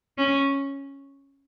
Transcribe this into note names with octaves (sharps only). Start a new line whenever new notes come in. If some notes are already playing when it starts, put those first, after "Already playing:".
C#4